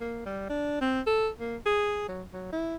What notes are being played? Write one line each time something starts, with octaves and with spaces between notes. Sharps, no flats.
A#3
G3
D4
C4
A4
A#3
G#4
F#3
F#3
E4